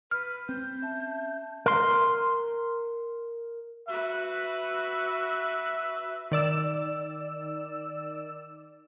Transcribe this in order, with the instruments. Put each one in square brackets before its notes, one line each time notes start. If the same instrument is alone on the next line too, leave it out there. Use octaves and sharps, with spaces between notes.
[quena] B4 [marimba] F6
[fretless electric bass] C4 [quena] G6
[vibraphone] C#4 E5 A5
[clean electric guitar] A#4 C6
[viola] F#4 B4 [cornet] E5
[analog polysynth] D#3 D5 E6